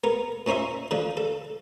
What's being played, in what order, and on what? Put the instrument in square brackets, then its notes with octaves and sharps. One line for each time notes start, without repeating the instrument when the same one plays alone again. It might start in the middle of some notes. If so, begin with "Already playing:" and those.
[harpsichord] B3 A#4
A#2 C#4 D#4 C5 E5
D3 F3 D4
A4